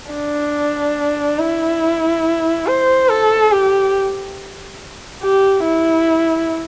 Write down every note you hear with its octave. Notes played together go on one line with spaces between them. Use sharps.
D4
E4
C5
A4
G4
G4
E4